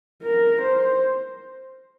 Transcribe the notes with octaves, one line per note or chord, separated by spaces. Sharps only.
A#4
C5